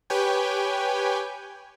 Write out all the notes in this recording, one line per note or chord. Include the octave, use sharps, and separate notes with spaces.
G4 B4 C#5 G5 G#5